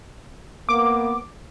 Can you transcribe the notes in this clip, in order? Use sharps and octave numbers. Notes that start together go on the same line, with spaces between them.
A#3 B3 D6